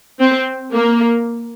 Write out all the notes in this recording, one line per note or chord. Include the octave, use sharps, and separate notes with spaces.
C4
A#3